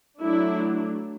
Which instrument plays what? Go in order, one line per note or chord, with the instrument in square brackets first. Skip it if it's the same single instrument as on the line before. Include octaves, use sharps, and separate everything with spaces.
[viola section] F#3 A3 D4 E4